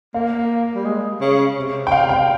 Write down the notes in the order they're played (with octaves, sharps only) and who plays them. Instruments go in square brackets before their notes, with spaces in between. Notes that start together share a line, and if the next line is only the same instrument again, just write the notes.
[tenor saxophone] A#3 [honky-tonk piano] F5
[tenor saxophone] G3
G#3
C#3
C3
[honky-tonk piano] G5
F5
G5